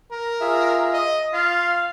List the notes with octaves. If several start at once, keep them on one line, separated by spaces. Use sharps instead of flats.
A#4
F4 G#4 E5
D#5
F4 F5